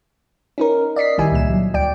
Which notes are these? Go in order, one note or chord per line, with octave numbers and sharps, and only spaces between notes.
C#4 D#4 A#4
D5 D#5 B6 C7
A#1 D#3 G3 E4 E5 G#5
C#2 A#2 E7
F#3
D2 D5 G5 D7